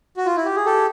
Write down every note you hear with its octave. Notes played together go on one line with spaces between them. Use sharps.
F#4
F4
E4
G4
G#4
G4 A4